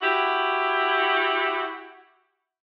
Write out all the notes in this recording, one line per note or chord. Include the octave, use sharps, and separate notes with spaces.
E4 F#4 G4